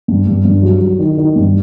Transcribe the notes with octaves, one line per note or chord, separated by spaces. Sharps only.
G2
G2
G2
F#3
F#3
D#3
D#3
G2